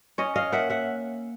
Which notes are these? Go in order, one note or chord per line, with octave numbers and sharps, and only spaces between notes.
C#4 C#5 D#5
D#5 F5
A#3 E5 F#5
E5 F#5